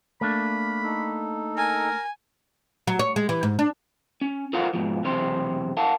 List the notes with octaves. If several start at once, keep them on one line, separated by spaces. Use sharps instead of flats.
A3 A#3 D4 B5
D#4 A4
A#4 G#5
F#3
C#5
G#3
E3
G#2
D4
C#4
F4 A4 A#4 C5 F5 F#5
G#2 B2 F3
B1 E2 C3 C5
A#4 F5 F#5 A5